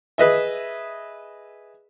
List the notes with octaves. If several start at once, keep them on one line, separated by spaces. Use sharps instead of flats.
G#4 B4 D#5 E5